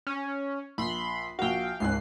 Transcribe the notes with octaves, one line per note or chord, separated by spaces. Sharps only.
C#4
A#1 B5 C6
A#1 F#4 F5 G5
C#2 G#2 G#5 F#6 C7